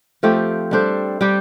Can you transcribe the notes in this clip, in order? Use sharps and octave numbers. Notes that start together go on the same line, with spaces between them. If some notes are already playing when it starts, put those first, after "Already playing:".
F3 A3 C4 G4
G3 D4 A4 C5
G3 D4 G4